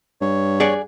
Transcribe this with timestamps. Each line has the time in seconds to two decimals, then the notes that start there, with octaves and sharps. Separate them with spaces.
0.21 G2 C#5
0.60 G#4 D5 F#5